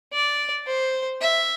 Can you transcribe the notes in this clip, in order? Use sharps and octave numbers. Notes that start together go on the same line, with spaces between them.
D5
C5
E5